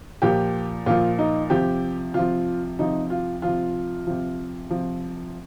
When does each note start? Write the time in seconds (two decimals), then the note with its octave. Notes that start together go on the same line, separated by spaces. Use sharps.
0.22 A#2 F3 G4
0.86 A#2 F3 F4
1.19 D#4
1.50 C3 F3 G4
2.14 C3 F3 F4
2.79 C3 F3 D#4
3.10 F4
3.42 C3 F3 F4
4.07 C3 F3
4.70 C3 F3